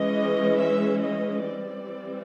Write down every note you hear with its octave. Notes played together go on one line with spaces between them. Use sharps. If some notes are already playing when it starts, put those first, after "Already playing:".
Already playing: E3 G#3 C#4 D#5
E5
D#5
E3 G3 C4 D5